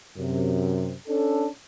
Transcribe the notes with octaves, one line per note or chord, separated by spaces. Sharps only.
F#2 C3
C#4 D4 A4